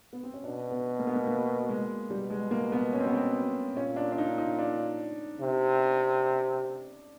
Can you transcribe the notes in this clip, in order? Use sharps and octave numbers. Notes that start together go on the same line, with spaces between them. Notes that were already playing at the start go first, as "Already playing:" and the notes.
B3
C4
C#4
B2 D4
B3
A#3
B3
A#3
A#3
G#3
B2 G3
G#3
A#3
B3
C#4
C4
B3
C4
A#2 C#4
D4
D4
D#4
D#4
D4
C3